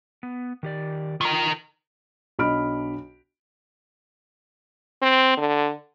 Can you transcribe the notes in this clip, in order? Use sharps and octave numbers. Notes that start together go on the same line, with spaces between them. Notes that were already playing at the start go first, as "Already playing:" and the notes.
B3
D#3 G4 D5
D#3 F4 A#4
B1 D4 D#5 B5 F6 D7
C4
D3